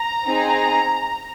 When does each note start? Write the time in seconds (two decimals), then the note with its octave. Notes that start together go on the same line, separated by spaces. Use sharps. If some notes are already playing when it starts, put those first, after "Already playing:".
Already playing: A#5
0.24 C4 D#4 G#4